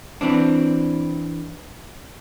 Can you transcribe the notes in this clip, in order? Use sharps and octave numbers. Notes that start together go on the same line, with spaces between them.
E3 C4 D4